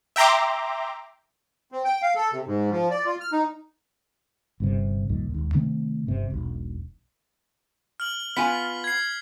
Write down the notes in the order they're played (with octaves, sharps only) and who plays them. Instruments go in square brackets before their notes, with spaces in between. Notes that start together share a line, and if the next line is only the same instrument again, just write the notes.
[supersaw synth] E5 G5 A#5 C6 D6
[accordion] C4
G5
F5
A4
C3
G#2
F3
D5
F4
F6
D#4
[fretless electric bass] G1 G2 C3
C2 F2 A#2 D#3
E1 D#2
C3 D#3 A3 C4
G1 C3
E1 B1
[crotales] F6 F#7
[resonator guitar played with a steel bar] B3 F4 G#5 [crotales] B6
[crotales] G#6 C7